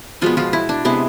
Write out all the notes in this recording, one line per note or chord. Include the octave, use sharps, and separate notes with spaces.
B2 F3 G#3 B3 F4
F3 F4
E4
D4
C3 G#3 B3 E4